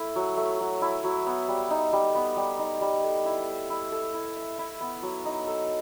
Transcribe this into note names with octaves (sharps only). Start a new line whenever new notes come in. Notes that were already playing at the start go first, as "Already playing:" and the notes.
Already playing: A3 E4
F#3
A3
F#3
E4
F#3
B3
G3
D#4
G3
B3
G3
D#4
G3
A4
E4
E5
E4
A4
E4
E5
E4
B3
F#3
D#4
A4